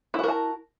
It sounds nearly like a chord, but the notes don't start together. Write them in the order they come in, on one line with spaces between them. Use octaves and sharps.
E4 F#4 A#4 A5